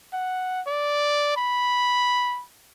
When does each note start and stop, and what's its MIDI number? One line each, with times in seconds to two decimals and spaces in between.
0.13 0.61 78
0.67 1.34 74
1.37 2.43 83